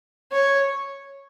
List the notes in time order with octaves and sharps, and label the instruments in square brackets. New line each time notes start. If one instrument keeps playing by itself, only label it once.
[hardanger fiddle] C#5